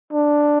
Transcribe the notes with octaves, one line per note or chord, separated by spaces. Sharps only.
D4